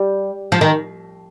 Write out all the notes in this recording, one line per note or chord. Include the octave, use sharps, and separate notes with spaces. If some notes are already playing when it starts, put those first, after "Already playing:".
Already playing: G3
F3
D#3